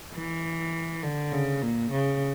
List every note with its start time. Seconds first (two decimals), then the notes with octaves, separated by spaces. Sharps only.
0.15 E3
1.03 D3
1.32 C#3
1.62 A#2
1.91 C#3